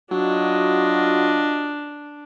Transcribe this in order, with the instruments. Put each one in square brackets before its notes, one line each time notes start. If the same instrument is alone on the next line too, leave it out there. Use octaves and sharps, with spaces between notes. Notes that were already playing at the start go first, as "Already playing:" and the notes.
[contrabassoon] F#3 [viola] D4 [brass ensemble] F4 F#4 D#5